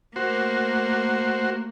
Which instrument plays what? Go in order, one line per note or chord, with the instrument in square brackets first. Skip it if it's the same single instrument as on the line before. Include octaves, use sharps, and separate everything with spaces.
[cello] A3 A#3 [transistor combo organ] F#4 C5